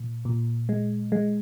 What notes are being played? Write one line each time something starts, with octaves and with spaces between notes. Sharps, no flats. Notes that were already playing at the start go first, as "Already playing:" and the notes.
Already playing: A#2
A#2
G#3
G#3